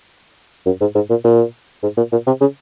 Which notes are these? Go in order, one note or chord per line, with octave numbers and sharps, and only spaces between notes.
F#2
G#2
G#2
A#2
A#2
G#2
A#2
A#2
C3
C#3